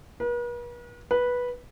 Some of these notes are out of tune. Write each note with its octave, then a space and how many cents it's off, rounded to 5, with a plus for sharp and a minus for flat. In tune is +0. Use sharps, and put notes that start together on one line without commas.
B4 -45
B4 -10